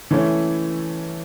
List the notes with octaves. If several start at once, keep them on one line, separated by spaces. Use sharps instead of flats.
E3 A3 C#4 E4